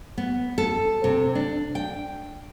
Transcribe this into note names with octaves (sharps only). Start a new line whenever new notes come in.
B3
A4
C3
D4
G5